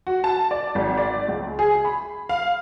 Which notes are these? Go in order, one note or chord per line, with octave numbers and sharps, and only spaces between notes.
F#4
A5
D5
G#1
D5
C#2
G#4
B5
F5